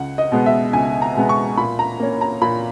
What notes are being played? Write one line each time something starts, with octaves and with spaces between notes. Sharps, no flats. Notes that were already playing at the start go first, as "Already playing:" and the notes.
Already playing: C#2 F#5
D#5
B2 G#3 B3
E5
C#2 G#5
A#5
B2 G#3 B3
C#6
A#2 B5
A#5
A#3 C#4
A#5
A#2 B5